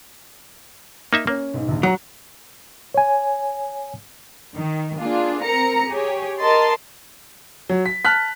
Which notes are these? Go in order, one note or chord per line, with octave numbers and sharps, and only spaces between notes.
A#3 D#4 E5
A#3 C#4
B1 G#2
A#1 D#2
F#3 A#5
C#5 G#5
D#3
A#3 D4 F4 G#4
C4 A#4 A#5 C#7
G4 G#4 C#5
A#4 D#5 A5 C6 A6
F#3
B6
A5 F6 F#6 B6